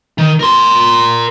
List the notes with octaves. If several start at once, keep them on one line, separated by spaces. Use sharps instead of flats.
D#3
A#4 C6